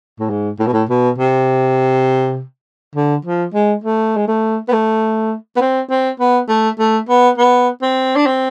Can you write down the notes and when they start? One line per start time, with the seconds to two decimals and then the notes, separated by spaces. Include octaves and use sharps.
0.19 A2
0.30 G#2
0.59 A2
0.67 B2
0.74 A2
0.89 B2
1.18 C3
2.95 D3
3.25 F3
3.54 G#3
3.84 A3
4.17 G#3
4.28 A3
4.68 B3
4.72 A3
5.57 B3
5.61 C4
5.90 C4
6.20 B3
6.49 A3
6.79 A3
7.09 B3
7.38 B3
7.82 C4
8.16 D4
8.26 C4